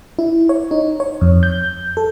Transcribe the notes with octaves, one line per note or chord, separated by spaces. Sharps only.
E4
C#5
D#4
C#5
F2
G6
A4